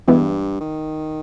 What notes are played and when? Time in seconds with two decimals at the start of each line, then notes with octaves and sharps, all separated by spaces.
0.07 G2 E3 G#3 B3 E4
0.60 D#3